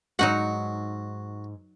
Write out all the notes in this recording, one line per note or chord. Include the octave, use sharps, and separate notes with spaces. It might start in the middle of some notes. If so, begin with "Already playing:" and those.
G#2 F#3 D#4 F#4 F#5